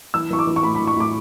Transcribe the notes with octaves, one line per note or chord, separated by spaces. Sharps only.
E3 E6
E3 C#6
D6
E3
C#6
A2 B5
B5
E3
C#6
A2 D6